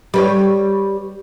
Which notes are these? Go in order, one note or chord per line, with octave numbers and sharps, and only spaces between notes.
G3 B4 C#5